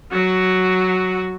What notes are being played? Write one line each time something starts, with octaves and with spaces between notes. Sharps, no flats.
F#3 F#4